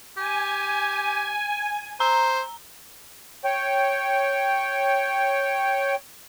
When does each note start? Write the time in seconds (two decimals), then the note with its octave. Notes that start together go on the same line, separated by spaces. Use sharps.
0.17 G4 G#5
2.00 C5 A#5
3.44 C#5 G5